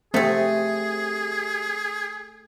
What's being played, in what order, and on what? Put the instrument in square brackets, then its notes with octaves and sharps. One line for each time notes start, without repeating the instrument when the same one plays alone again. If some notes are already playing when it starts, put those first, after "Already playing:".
[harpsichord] C3 D#6 [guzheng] A3 A4 [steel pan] C4 [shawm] G#4